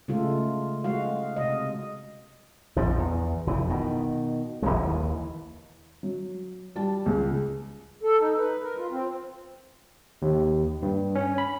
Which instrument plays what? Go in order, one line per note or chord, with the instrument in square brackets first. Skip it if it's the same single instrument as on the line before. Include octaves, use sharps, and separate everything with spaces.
[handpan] C#3 G#3 A3 F4 A4
G#3 F#4 F5
C3 D#5
[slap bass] A#1 F2 G#2 F3
E2
F1 E3
B2 D#3
D1 G1 F2 G#3
D#2 E3
[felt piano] F#3
G3 A5
C#2
[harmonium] A4
D#4
B4
A#4
F4
C4
[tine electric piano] D#2
G2
C#4
B5